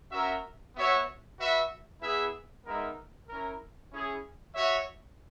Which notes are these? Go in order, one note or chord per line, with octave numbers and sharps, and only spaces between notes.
C#4 F#4 A#4 E5
B3 F#4 C#5 E5
F#4 B4 E5
B3 E4 G#4 B4 E5
G#3 B3 D#4 A#4 E5
C#4 E4 A#4
C#4 E4 G#4
F#4 C#5 E5